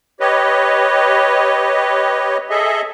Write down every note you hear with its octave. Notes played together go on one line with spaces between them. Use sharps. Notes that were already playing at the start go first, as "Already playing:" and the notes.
G4 B4 C#5 D#5
G#4 A4 D#5 E5